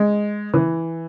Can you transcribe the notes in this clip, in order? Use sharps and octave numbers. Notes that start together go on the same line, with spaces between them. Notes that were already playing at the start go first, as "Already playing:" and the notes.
Already playing: G#3
E3